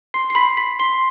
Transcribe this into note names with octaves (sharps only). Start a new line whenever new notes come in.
C6 C7
C7
B5 B6
B5 B6
C6 C7